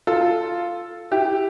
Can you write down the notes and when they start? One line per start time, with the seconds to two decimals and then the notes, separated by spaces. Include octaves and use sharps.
0.07 F4 A4
1.11 E4 G4